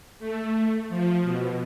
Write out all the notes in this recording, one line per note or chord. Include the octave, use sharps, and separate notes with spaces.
A3
F3
B2